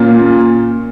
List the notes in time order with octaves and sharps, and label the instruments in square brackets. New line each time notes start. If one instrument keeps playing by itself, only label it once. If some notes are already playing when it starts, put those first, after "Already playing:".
Already playing: [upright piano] A#2 A#3 C#4 F4